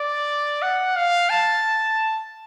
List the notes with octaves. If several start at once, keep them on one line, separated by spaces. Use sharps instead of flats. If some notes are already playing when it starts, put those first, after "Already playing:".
Already playing: D5
F#5
F5
A5